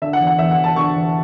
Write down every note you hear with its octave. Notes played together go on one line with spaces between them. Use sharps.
D3 E5
F#5
E2
F#5
E2 E5
F#5
E2
A5
D3 C#6
E2